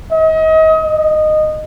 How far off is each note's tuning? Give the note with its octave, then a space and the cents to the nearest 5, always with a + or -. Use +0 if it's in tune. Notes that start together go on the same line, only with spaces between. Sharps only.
D#5 +35
D#5 -15